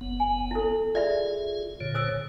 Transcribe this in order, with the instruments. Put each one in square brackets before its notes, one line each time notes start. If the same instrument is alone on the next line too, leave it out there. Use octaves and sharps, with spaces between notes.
[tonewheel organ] F#1 B3
[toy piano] G#5
E4 A4
[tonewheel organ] F4 G#4 [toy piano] D5 E5 B5
[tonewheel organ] A#2 D3 C#5
[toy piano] C5 D#6 E6